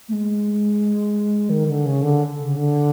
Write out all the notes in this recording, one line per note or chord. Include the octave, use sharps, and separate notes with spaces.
A3
G#3
D#3
D3
C#3
D3
C#3
D3